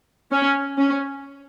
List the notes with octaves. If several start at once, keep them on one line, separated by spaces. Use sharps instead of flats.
C#4
C#4